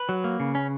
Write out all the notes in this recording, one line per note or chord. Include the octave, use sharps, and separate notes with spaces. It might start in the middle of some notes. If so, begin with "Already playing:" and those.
Already playing: B4
F#3
A#3
C#3
C#4